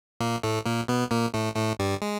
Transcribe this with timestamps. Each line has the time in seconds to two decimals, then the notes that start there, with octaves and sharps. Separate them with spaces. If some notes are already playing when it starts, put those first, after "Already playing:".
0.20 A#2 A#3
0.43 A2 A3
0.65 A#2 A#3
0.88 B2 B3
1.11 A#2 A#3
1.34 A2 A3
1.56 A2 A3
1.79 G2 G3
2.02 G#3